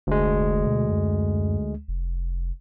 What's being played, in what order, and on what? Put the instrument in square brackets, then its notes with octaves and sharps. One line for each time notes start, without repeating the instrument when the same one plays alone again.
[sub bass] F1 [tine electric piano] D2 G#3
[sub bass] B2
F#2
F1